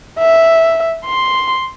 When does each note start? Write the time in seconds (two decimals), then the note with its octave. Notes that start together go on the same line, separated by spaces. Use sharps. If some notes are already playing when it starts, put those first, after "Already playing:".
0.19 E5
1.06 C6